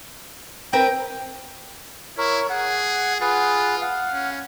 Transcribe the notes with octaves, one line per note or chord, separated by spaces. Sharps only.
C4 A#4 B4 G5
E4 A#4 C#5
G#4 F#5
F4 G#4 B4 F#5
F5 F#5
C#4